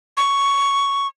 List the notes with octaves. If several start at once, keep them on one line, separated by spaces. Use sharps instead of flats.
C#6